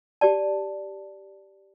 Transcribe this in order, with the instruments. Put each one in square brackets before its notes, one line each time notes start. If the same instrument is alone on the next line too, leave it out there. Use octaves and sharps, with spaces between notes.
[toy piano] G4 D5 A5